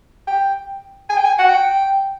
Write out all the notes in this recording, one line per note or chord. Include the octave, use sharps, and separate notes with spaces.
G5
G#5
G5
G#5
F#5
G5